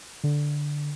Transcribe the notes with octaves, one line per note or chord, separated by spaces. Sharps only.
D3